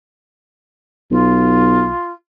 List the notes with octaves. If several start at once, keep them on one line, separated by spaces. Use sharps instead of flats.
B1 F4